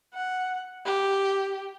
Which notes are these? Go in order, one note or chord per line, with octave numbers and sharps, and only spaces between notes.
F#5
G4